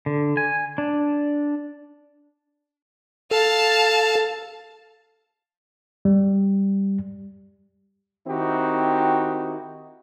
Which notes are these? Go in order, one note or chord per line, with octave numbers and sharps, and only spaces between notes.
D3
G#5
D4
A4 F5 A5
G3
D#3 C4 D#4 E4 F#4 G4